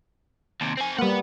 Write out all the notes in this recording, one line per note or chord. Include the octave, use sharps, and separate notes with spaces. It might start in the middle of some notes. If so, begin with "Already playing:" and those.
D#2 C3
C4 G#5
G3 A#3 B4 F#5